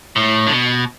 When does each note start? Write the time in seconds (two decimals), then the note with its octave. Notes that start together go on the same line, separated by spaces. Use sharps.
0.16 A2
0.47 D3
0.52 B2